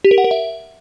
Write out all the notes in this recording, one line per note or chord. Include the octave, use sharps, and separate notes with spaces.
G4
A#4
F#5
A#4
E5